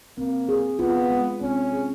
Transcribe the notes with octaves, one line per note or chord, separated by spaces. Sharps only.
A#3 C4
G#4
B3 F4
G#3
C4 C#4
G#4